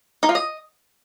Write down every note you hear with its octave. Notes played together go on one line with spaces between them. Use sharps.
D#4
F4
D#5